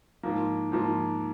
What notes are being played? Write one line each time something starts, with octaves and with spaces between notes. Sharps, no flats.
G#2 F3 A#3
G#2 F3 A#3